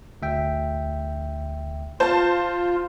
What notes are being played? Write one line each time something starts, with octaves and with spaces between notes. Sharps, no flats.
D2 E5 G5
F4 C5 A5 G6